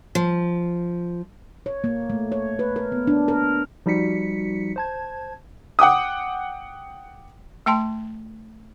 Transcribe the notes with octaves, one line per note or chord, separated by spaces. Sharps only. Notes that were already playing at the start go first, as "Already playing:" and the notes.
F3
C#5
A#3
A3
C#5
B4
A#4
B3
D4
A#4
F3 G3 D#4 F#4 B6 C#7
C5 A5 G#6
F#5 G5 D6 D#6
A3 G5 A5 C6